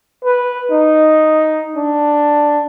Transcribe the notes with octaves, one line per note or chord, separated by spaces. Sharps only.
B4
D#4
D4